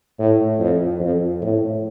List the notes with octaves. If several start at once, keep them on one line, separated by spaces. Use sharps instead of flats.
A2
F2
F2
A2